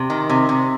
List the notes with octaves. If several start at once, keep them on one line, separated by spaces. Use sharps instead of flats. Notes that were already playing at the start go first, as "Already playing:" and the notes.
Already playing: C3
D#3
C3
C3